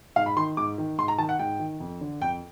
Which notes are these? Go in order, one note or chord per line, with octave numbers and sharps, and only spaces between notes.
G#2 F5
B5
D#3 C6
G#2 D6
D#3
G#2 C6
A#5
D#3 A5
F#5
G#2 G5
D#3
F2
D3
F2 G5